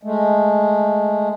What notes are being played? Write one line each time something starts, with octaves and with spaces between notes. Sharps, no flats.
G#3 A3